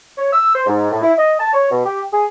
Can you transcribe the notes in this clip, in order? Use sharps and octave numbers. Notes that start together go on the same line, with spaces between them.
C#5
E6
C5
G#2
A2
E4
D#5
A5
C#5
B2
G4
G#4